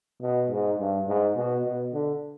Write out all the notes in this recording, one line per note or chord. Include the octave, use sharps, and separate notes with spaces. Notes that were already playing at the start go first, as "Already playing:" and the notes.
B2
G#2
G2
G#2
B2
B2
D3